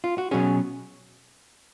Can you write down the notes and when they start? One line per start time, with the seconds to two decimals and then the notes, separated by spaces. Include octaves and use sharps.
0.04 F4
0.18 F#4
0.31 B2 F#3 C#4 G#4